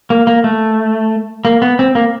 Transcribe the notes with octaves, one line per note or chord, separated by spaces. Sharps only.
A#3
A#3
A3
A#3
B3
C4
A#3